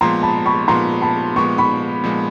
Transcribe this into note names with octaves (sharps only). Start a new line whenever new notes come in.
A#2 F3 G#3 B3 A#5 C6
A5 B5
B5 C#6
A#2 F3 G#3 B3 A#5 C6
A5 B5
A#2 F3 G#3 B3 C#6
B5 C#6
A#2 F3 G#3 B3